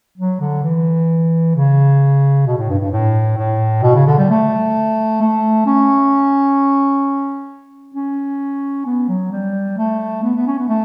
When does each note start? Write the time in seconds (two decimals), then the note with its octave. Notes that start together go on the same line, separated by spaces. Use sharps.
0.18 F#3
0.40 D3
0.63 E3
1.55 C#3
2.46 B2
2.58 A2
2.69 G2
2.80 G2
2.91 A2
3.37 A2
3.83 B2
3.95 C#3
4.07 D3
4.18 G3
4.29 A3
5.21 A3
5.66 C#4
7.94 C#4
8.86 B3
9.09 F#3
9.32 G3
9.78 A3
10.23 B3
10.36 B3
10.47 C#4
10.58 B3
10.69 A3